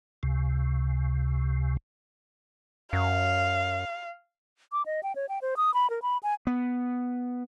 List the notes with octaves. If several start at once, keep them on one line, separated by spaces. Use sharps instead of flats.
C#2 C3
F#2 F5
D6
D#5
G5
C#5
G5
C5
D#6
B5
A#4
B5
G#5
B3